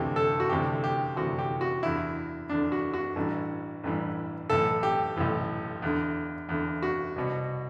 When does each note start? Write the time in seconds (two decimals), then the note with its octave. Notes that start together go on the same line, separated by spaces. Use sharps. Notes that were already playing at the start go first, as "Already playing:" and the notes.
Already playing: D2 C3 E3 G4
0.16 A4
0.40 F#4
0.49 D2 C3 E3 G4
0.84 G4
1.16 D2 C3 E3 F#4
1.39 G4
1.61 F#4
1.83 E2 D3 E4
2.49 E2 D3 D4
2.72 F#4
2.93 F#4
3.16 A1 G2 E3
3.84 A1 G2 E3
4.50 B1 A2 E3 A4
4.83 G4
5.16 B1 A2 E3
5.82 E2 D3
6.49 E2 D3
6.83 F#4
7.16 C2 B2